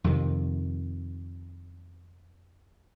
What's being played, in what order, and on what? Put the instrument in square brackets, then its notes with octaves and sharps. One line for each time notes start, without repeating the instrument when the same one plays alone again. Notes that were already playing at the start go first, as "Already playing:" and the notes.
[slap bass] F2 C3 D#3